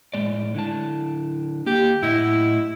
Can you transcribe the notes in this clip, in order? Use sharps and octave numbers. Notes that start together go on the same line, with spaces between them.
A2 G#3 D5
D3 E4 A5
A#3 G4
A2 E4 D#5 F#5